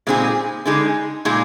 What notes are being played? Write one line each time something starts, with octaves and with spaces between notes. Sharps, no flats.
A#2 G#3 C4 D#4 G#4
D3 G#3 D#4 G#4
A#2 G#3 D#4 G#4